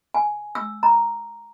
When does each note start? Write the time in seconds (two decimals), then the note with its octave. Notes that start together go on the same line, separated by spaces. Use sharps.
0.14 G#5
0.55 E6
0.83 A#5